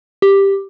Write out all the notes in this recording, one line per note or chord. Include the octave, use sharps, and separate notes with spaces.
G4